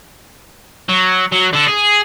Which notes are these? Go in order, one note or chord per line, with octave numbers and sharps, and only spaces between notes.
F#3
F#3
D3 A4
G#4